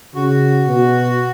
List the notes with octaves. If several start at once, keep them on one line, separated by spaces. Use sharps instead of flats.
C#3 F#4
B2